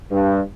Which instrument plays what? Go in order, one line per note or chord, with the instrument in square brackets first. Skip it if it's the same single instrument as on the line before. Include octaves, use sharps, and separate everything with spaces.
[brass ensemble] G2